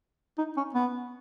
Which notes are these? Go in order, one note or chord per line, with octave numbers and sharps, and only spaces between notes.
D#4
C#4
B3